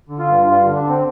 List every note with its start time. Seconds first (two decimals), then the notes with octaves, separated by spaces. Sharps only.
0.09 D3
0.19 F4
0.28 G2
0.47 G2 F4
0.65 D3
0.75 D4
0.84 D3 C4